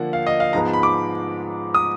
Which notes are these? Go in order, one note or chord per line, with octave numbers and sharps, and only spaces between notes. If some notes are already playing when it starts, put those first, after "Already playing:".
Already playing: D3 F3 A#3 F#5
F5
D#5
F5
G#2 F3 G#3 B3 A#5
B5
D6
D#6